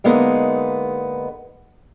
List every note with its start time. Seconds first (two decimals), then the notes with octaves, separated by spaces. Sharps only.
0.04 D3 G#3 A#3 B3 D#4